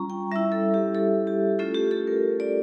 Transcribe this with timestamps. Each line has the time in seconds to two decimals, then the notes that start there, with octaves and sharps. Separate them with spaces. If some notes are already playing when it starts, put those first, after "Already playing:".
Already playing: G3 C#4 F4 A#5 C#6
0.10 G5
0.32 G3 C#4 E4 E5
0.52 A4
0.74 G4
0.95 A4
1.27 G4
1.59 A3 C#4 F4 A4
1.75 G4
1.91 A4
2.07 A#4
2.40 D5